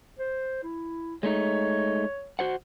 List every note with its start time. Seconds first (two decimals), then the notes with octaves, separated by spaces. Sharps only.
0.19 C5
0.63 E4
1.23 G#3 A3 D#4 C#5
2.39 F#4 C5 F#5